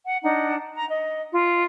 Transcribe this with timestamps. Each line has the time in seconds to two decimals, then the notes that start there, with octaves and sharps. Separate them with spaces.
0.06 F#5
0.22 D4 D#4 F#5
0.75 A#5
0.88 D#5
1.31 F4